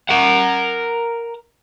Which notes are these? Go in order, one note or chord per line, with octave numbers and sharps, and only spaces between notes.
A#4 F#5